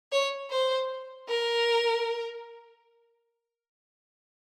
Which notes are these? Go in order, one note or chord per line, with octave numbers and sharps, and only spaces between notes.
C#5
C5
A#4